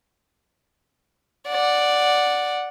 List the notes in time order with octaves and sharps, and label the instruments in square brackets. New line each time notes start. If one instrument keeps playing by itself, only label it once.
[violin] D5 F#5